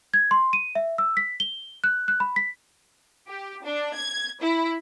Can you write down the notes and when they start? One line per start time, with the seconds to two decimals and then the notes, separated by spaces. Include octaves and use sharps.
0.14 G#6
0.31 C6
0.53 D#7
0.75 E5
0.98 E6
1.17 B6
1.40 G7
1.84 F#6
2.08 F#6
2.20 B5
2.36 B6
3.27 G4
3.64 D4
3.94 G#6
4.41 E4